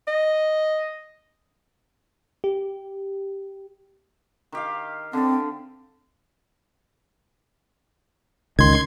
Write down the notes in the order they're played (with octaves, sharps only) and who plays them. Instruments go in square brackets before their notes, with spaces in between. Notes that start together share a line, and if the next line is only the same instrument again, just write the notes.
[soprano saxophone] D#5
[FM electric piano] G4
[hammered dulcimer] D#3 G4 F5
[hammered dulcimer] D3 D5 [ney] C4
[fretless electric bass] C#2 D#3 [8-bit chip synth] C6 G#6